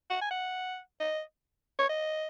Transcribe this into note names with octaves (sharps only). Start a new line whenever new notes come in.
F#5
G#5
F#5
D#5
C#5
D#5